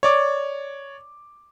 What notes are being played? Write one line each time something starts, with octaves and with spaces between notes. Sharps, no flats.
C#5 D5 D6